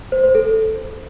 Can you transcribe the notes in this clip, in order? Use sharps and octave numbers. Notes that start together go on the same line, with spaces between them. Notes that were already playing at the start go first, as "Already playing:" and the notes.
C5
C5
A4